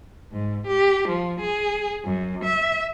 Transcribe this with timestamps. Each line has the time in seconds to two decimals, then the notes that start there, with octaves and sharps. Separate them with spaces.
0.32 G#2
0.67 G4
1.08 F3
1.40 G#4
2.05 F#2
2.44 E5